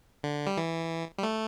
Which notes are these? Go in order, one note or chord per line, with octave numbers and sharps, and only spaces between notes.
D3
G3
E3
G3
A3